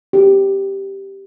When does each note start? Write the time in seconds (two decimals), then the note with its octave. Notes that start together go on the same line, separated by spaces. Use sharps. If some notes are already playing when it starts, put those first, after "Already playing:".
0.13 G4